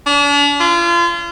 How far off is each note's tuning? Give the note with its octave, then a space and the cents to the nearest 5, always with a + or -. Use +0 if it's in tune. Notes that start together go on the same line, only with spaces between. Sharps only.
D4 -40
F4 -30